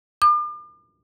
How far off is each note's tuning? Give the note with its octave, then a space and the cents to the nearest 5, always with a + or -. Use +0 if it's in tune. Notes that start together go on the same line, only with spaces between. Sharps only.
D6 +40